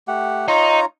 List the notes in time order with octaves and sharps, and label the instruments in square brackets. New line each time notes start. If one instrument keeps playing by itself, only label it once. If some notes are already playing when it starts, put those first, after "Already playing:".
[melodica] A3 G4 F#5
[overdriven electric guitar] D#4 [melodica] F4 C#5 A#5